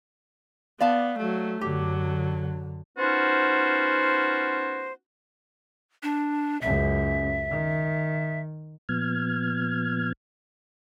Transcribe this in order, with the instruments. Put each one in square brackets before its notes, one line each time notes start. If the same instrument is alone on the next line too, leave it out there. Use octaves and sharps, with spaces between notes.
[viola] B3 [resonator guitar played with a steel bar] D5 F5 A5
[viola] F#3 A3
[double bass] F#2 D3 [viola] F#3 [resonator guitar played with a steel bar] G4
[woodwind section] B3 C#4 D#4 F4 F#4 C5
[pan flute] D4
[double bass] C#2 F#2 [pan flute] E5
[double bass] D#3
[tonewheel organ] A#2 F3 B3 F6 G#6